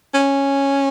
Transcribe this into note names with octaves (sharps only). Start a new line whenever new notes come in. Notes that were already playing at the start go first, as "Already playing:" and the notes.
C#4